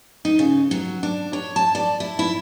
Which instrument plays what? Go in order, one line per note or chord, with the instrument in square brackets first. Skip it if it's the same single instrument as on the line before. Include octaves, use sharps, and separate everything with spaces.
[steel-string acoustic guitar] D#4
C#3
F#3
D4
C#5
A5
D5
E4
E4